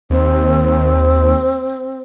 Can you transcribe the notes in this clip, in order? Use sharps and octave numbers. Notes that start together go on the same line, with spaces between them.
D#2 C4